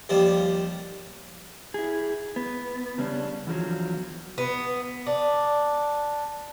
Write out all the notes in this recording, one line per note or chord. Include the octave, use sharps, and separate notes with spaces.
D#2 F3 G3
E4 G#4
B3
C#3 G3 C#4 D4
E2 D3 F3 F#3
B3
D4